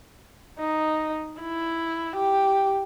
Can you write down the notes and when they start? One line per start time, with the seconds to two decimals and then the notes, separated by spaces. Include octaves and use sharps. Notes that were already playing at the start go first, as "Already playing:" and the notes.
0.59 D#4
1.41 E4
2.16 G4